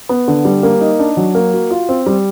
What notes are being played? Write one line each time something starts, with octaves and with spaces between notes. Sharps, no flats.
B3
D3
G3
A#3
D#4
D4
F#3
A#3
F#4
F4
C4
G3